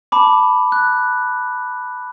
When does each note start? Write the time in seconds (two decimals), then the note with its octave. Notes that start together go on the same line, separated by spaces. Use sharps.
0.12 A5 B5 D6
0.72 F#6